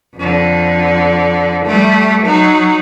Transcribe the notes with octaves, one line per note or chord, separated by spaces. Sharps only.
F2 D3
G3 A3
F#3 D#4